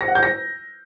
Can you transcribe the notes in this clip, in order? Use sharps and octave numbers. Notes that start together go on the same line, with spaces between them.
A#6
F#5
G6
A#6